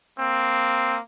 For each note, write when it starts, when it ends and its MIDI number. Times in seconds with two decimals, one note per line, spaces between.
0.19 0.99 58
0.19 0.99 60